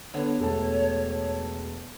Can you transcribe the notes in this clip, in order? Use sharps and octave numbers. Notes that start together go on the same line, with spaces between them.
D3 B3 C#5
E1 A3 A5